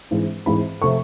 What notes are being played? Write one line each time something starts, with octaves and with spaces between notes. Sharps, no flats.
G#2 E3 G#3 C4
G#2 E3 G#3 C4 B5
C3 F3 A3 C#6